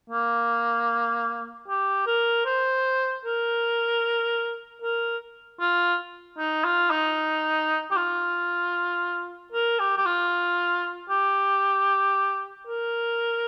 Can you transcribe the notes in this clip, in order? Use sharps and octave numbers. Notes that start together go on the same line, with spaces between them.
A#3
G4
A#4
C5
A#4
A#4
F4
D#4
F4
D#4
G4
F4
A#4
G4
G4
F4
G4
A#4